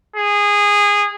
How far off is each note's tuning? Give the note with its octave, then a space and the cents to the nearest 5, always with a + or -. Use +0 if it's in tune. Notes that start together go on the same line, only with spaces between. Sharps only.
G#4 -20